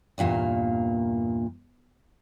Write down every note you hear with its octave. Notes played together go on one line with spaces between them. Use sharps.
E2 G2 A#2 A#3